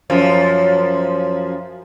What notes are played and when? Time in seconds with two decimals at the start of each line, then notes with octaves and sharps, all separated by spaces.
0.10 F#2 F3